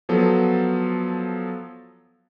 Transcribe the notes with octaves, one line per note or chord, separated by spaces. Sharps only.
F3 F#3 B3 A4